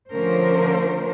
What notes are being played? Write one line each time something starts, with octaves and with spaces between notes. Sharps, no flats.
D3 F3 A3 C#4 A#4 C5